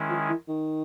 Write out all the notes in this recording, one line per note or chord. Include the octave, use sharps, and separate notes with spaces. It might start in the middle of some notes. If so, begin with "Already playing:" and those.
Already playing: D#3 G#3 C#4 E4
F3
E3
D#3